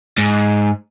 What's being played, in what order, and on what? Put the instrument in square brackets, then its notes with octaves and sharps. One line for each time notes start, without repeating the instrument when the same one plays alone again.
[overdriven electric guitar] G#2